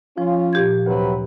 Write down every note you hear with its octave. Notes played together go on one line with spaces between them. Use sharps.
F3 C#4 F4
A#2 G4 G#6
D2 C3 F#3 B4